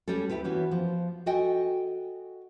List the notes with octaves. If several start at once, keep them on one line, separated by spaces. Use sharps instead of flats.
G3 C#4 G4 A4
D2 A#2 E4 G4 B4
E3 B3 C#4 F#4
F3
F#4 A4 D#5 G5 G#5